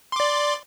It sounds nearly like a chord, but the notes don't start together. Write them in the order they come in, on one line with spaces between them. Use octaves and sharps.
C6 D6 D5